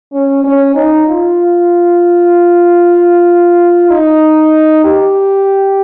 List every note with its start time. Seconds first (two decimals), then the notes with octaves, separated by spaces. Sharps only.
0.13 C#4
0.44 C#4
0.75 D#4
1.08 F4
3.90 D#4
4.85 G4